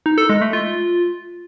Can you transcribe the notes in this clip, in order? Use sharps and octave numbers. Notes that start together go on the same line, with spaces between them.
D#4
A4
G#3
A3
F4